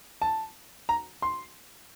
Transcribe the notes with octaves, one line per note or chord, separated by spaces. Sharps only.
A5
A#5
C6